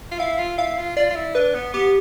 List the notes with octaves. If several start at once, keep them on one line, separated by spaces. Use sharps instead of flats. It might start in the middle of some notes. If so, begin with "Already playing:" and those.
F4
E4 F5
F4
E4 F5
F4
F4 D5
F4
E4
D4 B4
B3
B3 G4